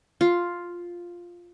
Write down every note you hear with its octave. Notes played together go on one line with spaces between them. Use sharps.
F4